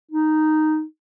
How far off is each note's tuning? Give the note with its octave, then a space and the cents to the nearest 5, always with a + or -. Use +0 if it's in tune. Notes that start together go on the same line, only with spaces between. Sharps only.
D#4 -5